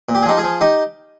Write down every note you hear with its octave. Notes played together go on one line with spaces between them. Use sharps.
A#2
G4
G#4
F3 D#4 G4
F4 G#4
F3
D#4 G4